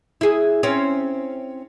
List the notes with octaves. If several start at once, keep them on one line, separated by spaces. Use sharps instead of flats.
E4 G#4
C4 C#4